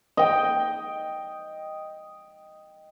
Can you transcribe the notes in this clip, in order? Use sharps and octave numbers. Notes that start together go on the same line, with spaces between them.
D#5 G5